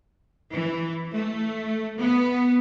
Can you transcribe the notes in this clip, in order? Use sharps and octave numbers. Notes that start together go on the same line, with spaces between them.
E3
A3
B3